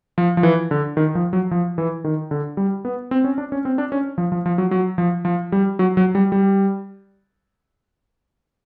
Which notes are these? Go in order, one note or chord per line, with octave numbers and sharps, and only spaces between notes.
F3
F3
E3
D3
D#3
F3
F#3
F3
E3
D#3
D3
G3
B3
C4
C#4
D4
C#4
C4
D4
C#4
F3
F3
F3
F#3
F#3
F3
F3
G3
F#3
F#3
G3
G3